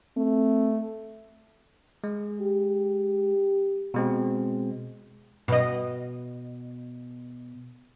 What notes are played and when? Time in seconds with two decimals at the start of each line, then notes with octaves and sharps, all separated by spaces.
0.17 A3 C4
2.04 G#3
2.41 G4
3.94 B2 G#3 C4
5.48 B2 D#5